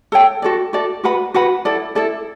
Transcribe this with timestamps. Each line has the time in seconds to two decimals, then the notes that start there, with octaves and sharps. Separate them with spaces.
0.12 A4 C#5 G5
0.42 F#4 A4 D5
0.73 F#4 A4 D5
1.04 F#4 B4 F#5 B5
1.34 F#4 B4 F#5 B5
1.65 E4 A4 D5
1.95 E4 A4 D5